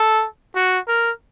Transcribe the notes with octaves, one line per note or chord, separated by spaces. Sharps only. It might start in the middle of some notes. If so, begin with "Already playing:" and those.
Already playing: A4
F#4
A#4